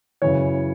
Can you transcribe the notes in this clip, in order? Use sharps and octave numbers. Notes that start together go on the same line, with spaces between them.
F#2 C#3 E3 C#5